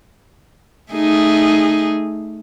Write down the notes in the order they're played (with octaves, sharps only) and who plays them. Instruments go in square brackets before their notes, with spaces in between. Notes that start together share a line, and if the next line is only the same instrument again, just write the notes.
[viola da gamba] A3 D#4 G#4